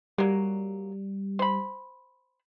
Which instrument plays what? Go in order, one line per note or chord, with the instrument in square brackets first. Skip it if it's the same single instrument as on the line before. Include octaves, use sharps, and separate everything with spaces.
[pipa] F#3 A#3 [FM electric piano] G3
[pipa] C5 B5